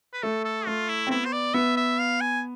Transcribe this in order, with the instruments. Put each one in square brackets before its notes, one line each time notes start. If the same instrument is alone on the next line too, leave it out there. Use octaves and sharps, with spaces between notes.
[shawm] B4
[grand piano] A3 [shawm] A4
[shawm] A4
[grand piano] A3 [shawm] F4
[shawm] E4
[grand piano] C4
[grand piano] B3 [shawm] E4
[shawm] C5
D5
[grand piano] B3 [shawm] E5
[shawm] E5
F5
G#5